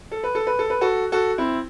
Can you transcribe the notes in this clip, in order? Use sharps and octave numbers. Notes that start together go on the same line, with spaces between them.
A4
B4
A4
B4
A4
B4
F#4 A4
F#4 A4
C4 E4